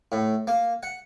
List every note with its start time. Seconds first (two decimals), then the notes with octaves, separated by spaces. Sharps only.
0.12 A2
0.47 A#3
0.83 F#5